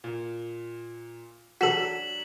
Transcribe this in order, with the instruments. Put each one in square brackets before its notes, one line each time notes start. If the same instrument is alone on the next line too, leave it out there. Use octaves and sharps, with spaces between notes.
[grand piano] A#2
[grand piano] F#3 D4 [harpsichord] F#4 A4 [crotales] B6 E7 F#7